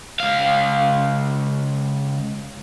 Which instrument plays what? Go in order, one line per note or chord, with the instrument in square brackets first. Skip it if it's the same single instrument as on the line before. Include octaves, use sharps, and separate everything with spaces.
[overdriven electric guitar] C#2 F5